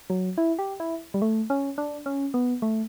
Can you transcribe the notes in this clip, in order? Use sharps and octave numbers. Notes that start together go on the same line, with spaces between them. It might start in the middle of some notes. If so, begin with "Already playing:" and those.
F#3
E4
G4
E4
G3
A3
C#4
D4
C#4
B3
A3